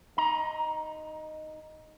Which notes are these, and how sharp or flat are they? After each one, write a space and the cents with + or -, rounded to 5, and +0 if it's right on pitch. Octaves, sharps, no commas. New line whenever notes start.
D#4 -5 A#5 +20